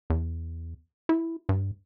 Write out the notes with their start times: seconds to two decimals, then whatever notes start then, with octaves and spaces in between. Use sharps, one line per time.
0.10 E2
1.09 E4
1.49 G2